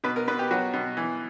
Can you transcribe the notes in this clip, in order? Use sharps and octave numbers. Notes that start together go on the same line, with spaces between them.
B2 B4
A#4
B2 B4
G4
F#3 F#4
B2
E3